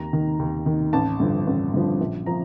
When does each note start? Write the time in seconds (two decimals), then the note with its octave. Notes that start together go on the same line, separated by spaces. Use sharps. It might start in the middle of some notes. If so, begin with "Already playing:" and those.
Already playing: D#2 A#5
0.13 D#3
0.39 D#2
0.66 D#3
0.93 A1 A5
1.20 G2 D3 F3
1.47 A1
1.74 G2 D3 F3
2.00 A#1
2.26 F3 A#5